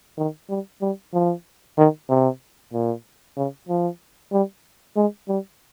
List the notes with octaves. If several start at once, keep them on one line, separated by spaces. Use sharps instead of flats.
D#3
G3
G3
F3
D#3
C3
A#2
C#3
F3
G3
G#3
G3